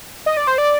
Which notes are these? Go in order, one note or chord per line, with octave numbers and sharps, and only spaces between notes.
D#5
D5
C5
D5